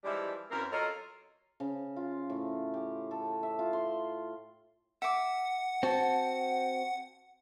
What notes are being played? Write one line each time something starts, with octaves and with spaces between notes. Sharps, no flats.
E3 F3 G3 G#3 D4 E5
F#2 E3 C4 A#4
F#3 F4 A4 A#4 C#5 D#5
C#3
F4
A2
G4
A4
E5
F4
C6
E5 F#5 D6
C4 F#4 A5